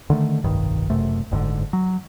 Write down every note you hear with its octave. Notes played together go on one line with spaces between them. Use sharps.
D3 D#3 A3
F1 B1 G2 D#3
F#1 F#2 C3 A3
F#1 G#2 B2 D3
F#3